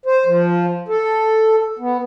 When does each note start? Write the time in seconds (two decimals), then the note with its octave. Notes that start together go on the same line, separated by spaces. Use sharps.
0.06 C5
0.26 F3
0.88 A4
1.79 B3